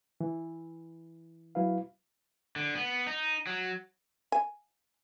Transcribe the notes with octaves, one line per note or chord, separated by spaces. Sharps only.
E3
F#3 E4 B4 F5
D3
B3
D#4
F#3
G#5